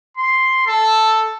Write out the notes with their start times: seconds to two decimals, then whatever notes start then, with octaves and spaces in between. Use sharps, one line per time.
0.17 C6
0.67 A4